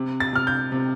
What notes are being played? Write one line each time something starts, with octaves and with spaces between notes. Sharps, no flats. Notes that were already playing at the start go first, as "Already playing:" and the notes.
Already playing: C3
A6
C3 F6
G6
C3